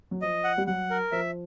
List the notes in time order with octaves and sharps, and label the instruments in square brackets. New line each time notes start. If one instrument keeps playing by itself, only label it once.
[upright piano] F#3
[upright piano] F3 [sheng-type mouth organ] D#5
[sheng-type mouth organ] F#5
[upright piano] G3
[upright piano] F#3 [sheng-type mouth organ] F#5
[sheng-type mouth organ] A#4
[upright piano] F3 [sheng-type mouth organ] E5